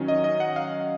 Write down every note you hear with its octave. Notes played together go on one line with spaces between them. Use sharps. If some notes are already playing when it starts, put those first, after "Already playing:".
Already playing: D#3 F#3 C#4
D#5
D#5
F#5
F5